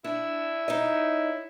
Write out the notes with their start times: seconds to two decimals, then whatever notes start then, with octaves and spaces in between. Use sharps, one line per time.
0.04 D4 E4
0.68 D#4 C#5 D#5